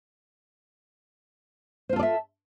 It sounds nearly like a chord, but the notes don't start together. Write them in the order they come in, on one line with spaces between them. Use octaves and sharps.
C5 F4 A4 D5 E5